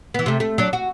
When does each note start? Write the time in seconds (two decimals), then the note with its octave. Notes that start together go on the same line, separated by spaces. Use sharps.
0.14 E3 B3
0.26 C3 A3
0.40 A3
0.58 F#3 D4
0.73 F#4